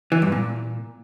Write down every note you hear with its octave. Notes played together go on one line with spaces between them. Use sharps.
E3
G2
A#2